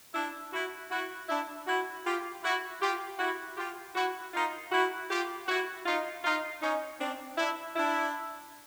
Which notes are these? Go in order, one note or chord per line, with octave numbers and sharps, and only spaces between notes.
D4 E4
E4 F#4
E4 F#4
D4 E4
E4 F#4
F4 G4
E4 F#4
F4 G4
E4 F#4
F4 G4
E4 F#4
D#4 F4
E4 F#4
F4 G4
E4 F#4
D#4 F4
D#4 F4
C#4 D#4
C4 D4
D4 E4
D4 E4